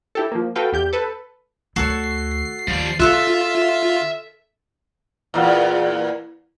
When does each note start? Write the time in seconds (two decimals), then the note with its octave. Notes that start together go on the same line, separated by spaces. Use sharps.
0.15 E4 G4 A4
0.32 F3 A#3
0.55 F#4 A4 B4 F5 G5
0.72 E2 G4 G6
0.93 A4 B4
1.76 D2 F#4 A4 C#5 C7
2.67 D#2 F3 G3
3.00 D3 F4 A4 E5 E6 F#6
5.34 E2 A#2